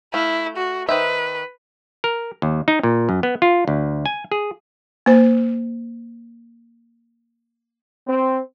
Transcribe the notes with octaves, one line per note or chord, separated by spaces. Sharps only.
A3 E4 F5
F#4
D#3 B4 C5 E5
A#4
D#2
D#4
A#2
F#2
B3
F4
D2
G#5
G#4
A#3 C5
C4